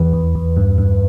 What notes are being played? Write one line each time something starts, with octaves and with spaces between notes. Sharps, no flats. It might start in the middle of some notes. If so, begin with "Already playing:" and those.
Already playing: E2 E3 B4
E2
E2
G2
G2